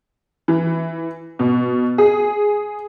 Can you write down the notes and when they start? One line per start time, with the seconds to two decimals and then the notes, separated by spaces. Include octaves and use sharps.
0.48 E3
1.39 B2
1.98 G#4